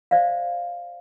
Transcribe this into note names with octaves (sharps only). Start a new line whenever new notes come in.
C5 D5 E5 F5